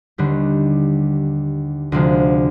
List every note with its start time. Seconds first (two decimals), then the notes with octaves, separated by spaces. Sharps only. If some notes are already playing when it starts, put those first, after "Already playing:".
0.18 D#2 D3 G3 D4
1.92 D2 C3 F3 G#3